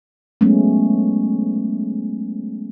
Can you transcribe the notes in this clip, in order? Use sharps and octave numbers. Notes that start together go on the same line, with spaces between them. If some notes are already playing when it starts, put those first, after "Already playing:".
F#3 G#3 A3 B3 C#4